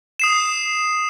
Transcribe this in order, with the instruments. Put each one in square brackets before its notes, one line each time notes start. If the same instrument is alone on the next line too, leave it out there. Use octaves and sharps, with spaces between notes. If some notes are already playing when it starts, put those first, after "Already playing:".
[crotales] D#6 C7 E7